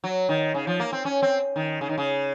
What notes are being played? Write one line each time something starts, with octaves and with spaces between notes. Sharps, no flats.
F#3
D#3
C#3
F3
A#3
C4
C#4
C4
D#3
C#3
D#3
C#3